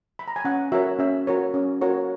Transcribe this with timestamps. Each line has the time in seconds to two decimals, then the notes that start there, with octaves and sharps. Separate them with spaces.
0.19 B5
0.28 A#5
0.36 G#5
0.45 C#4 F#5
0.72 F#4 A#4 C#5 E5
0.99 C#4 E5
1.27 F#4 A#4 C#5
1.54 C#4
1.81 F#4 A#4 C#5